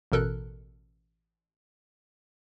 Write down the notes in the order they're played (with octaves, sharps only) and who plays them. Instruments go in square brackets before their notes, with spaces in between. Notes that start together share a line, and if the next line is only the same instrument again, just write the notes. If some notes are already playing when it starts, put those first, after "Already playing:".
[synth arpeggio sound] A1 B2 A4 A#4 F#6